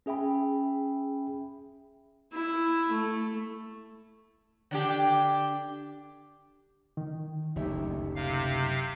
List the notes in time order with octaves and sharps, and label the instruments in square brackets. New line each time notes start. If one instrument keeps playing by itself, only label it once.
[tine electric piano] C#4 G#4 E5 G5 B5
[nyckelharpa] E4
A3
[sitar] D3 D4 G4
[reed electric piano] D#3
[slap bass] F#1 D2 [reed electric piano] D#4 G4 E5
[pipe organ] C3 F5